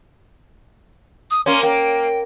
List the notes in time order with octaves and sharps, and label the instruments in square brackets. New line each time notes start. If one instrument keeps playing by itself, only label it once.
[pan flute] D#6
[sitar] A#3 C#4 [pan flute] C6
[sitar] A#3 [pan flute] G5